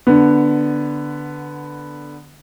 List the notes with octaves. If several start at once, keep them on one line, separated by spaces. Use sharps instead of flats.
D3 B3